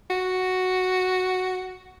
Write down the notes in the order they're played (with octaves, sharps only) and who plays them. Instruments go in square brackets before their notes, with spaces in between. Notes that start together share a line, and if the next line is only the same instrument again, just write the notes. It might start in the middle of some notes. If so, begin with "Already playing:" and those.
[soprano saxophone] F#4